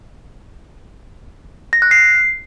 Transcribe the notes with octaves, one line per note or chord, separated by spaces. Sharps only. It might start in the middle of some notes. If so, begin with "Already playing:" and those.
A#6
F#6
C7